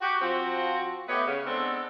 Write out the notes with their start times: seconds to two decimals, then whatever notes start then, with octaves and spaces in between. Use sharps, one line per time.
0.01 F#4 G4
0.21 F3 C4 F#4
1.08 A3 B3 G4 B4 C#5 D#5
1.27 C#3
1.45 G#3 B3 C4 D4 A4